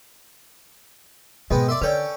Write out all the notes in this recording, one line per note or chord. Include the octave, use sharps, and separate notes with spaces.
G#2 B2 G#3 B3 C4 D#5
A#4 D5 E5 C6
D3 C#4 A4 B4 C#5 D5 G5